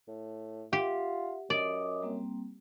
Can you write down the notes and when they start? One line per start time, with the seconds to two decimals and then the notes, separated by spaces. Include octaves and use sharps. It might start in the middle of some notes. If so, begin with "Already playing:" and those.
0.08 A2
0.73 F4 G4 E5 F#5
1.50 F#2 D5 D#5 D6 D#6
2.02 G3 A#3 C4